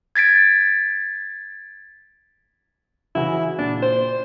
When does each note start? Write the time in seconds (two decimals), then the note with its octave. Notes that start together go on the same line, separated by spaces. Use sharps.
0.15 G#6 A6 B6 D7
3.15 C#3 E3 E4 F#4
3.59 A#2 D4
3.82 C5